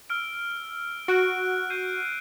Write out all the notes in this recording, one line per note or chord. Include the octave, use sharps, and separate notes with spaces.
E6 F6 D7
F#4 F#6 D7
G6 C7 D#7